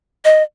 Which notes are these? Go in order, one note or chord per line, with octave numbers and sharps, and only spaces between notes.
D#5